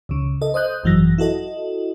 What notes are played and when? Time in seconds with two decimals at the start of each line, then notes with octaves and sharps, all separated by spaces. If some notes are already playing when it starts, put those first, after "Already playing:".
0.09 C#2 C#3
0.41 A4 D#5
0.54 C5 D#5 D#6 F#6 G6
0.83 G#1 F#2 E3 F#3 A#6
1.18 E4 F#4 A4 D#5